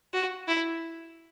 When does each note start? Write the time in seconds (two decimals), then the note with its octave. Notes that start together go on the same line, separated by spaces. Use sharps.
0.13 F#4
0.48 E4